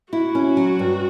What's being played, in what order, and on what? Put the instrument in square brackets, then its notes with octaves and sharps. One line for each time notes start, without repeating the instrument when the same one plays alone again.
[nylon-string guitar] E4 [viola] F#4
[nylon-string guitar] C#4
F#3
G2